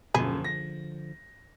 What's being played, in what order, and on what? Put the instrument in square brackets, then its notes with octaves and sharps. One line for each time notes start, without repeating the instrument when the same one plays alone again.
[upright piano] D#1 F#2 [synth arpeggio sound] B2 B5 [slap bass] D3 F3 [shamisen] G#4
[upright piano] A#6